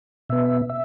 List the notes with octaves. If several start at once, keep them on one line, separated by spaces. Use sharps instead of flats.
B2 B3 E5
E5